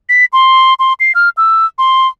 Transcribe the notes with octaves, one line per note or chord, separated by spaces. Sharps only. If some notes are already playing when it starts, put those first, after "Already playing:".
B6
C6
C6
C7
F6
E6
C6